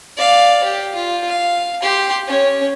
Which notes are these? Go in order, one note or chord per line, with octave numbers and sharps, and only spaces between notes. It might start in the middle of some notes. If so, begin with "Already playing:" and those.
D5 F5
G4
F4
F5
G4 C6
C#4 C#5